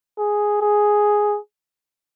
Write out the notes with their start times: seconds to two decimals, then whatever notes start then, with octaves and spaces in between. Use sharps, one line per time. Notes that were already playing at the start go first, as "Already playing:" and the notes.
0.18 G#4
0.62 G#4